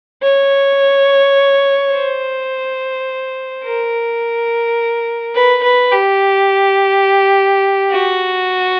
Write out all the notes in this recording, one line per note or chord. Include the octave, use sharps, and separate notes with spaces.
C#5
C5
A#4
B4
B4
G4
F#4